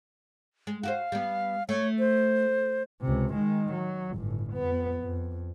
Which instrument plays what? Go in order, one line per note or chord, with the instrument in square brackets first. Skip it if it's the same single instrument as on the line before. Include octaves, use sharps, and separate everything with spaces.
[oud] G#3
[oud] F#4 G4 C5 [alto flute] F5
[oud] G3 B3
[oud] A3 [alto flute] C#5
[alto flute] C5
[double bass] C#2 C3
D#3 G#3
F#3
G1 A2
F2 B3
F2